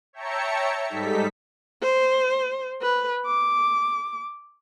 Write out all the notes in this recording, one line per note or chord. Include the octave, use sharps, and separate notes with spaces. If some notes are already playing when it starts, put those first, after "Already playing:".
C#5 E5 G5 A5 A#5 C#7
G#2 G3 D#4 A4 B6
C5
B4
D6